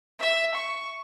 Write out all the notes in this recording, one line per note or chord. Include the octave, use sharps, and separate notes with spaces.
E5
C#6